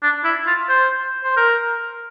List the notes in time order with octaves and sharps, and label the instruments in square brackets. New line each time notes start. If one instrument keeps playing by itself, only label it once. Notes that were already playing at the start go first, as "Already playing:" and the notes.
[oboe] D4
E4
F4
C5
C5
A#4